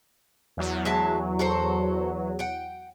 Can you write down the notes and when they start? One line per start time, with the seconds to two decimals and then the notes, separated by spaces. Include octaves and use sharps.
0.57 E2 F#3
0.85 G#3 E5 A5
1.39 F#4 A4 C5
2.39 F#5 G5